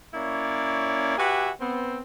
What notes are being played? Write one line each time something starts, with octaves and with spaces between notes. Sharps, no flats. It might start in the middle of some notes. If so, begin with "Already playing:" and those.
A#3 C#4 E4 C#5 D5
F#4 G4 B4 E5 G#5
B3 C4